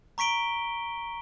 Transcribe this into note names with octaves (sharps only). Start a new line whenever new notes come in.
A#5 C#6 B6 D7 G7